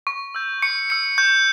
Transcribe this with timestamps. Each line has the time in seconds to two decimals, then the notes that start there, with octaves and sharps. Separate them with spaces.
0.07 C#6
0.35 E6 G6
0.62 C#6 C#7
0.90 E6 G6 C#7
1.18 C#6 G6